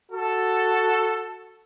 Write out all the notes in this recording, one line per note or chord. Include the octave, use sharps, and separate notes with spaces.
F#4 A4